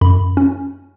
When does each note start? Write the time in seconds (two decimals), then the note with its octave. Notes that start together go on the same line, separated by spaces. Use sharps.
0.01 F#2 B5
0.37 C#4